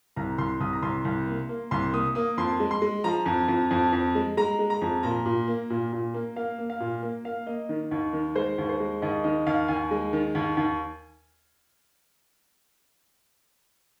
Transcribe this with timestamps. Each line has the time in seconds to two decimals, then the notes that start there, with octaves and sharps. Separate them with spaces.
0.16 C2 A#5
0.38 C2 C6
0.60 C2 D#6
0.73 A#5
0.82 C2 C6
1.05 C2
1.27 A#3
1.49 A#3
1.71 C2 C6
1.93 A#3 D#6
2.15 A#3 D#6
2.37 F2 C6
2.60 G#3
2.71 C6
2.82 G#3
3.04 F3 A#5
3.26 F2
3.48 F2
3.71 F2
3.93 F2
4.15 G#3
4.37 G#3 A#5
4.59 G#3
4.70 A#5
4.81 F2
5.03 A#2 A#5
5.26 A#2
5.48 A#3
5.70 A#2
5.93 A#2
6.14 A#3
6.36 A#3 F5
6.58 A#3
6.70 F5
6.80 A#2
7.03 A#3
7.25 A#3 F5
7.47 A#3 D#5
7.69 D#3
7.91 D#2
8.13 D#3
8.36 G#3 C5
8.58 D#2
8.69 C5
8.80 G#3
9.02 D#2 D#5
9.24 D#3 D#5
9.47 D#2 F5
9.68 D#2 G#5
9.91 G#3
10.13 D#3
10.35 D#2
10.57 D#2